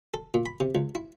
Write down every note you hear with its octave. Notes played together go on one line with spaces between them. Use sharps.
A4
A#2
B5
C3
C#2
E4